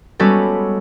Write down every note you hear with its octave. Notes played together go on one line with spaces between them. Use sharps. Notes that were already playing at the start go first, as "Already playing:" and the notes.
G3 G#3 B3 C#4 F#4 A4